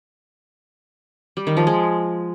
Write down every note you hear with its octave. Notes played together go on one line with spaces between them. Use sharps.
G3
D#3
F3
G#3